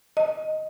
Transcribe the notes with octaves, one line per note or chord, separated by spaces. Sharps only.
D#5